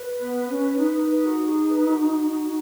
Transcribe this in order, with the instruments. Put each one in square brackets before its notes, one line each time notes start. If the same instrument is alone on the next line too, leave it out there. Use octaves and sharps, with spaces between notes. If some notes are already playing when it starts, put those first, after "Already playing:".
Already playing: [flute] B4
[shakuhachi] B3
C#4
D#4
[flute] B4
F#4
G#4
B4
F#4